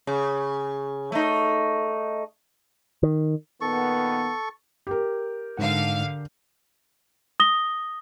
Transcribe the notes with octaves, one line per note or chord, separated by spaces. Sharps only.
C#3
A3 D#4
D#3
A#2 D#3 B3 A4 C#6
G4 A#4
G#2 D3 F5 F#5
D#6 A#6 G7